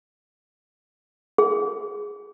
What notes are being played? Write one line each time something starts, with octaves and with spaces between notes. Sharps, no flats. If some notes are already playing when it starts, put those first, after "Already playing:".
G#4